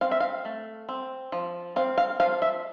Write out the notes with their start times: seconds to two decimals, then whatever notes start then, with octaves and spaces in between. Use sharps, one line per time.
0.01 C4 F5
0.11 E5
0.20 F5
0.45 A3
0.89 C4
1.32 F3
1.76 C4 F5
1.98 F5
2.20 F3 F5
2.42 E5